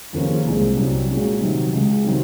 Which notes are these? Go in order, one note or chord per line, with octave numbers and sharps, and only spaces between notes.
D#2 C#3 F3 A#3 C#4
C2 A#2 G#3 C4
C2 C3 F#3 C#4
A#2 G#3 C#4 F#4
C3 D#3 F#3
C#2 C#3 G#3
C3 D#3 F#3 C4